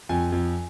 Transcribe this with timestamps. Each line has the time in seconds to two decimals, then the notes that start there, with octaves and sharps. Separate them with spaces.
0.09 F2 G#5
0.32 F2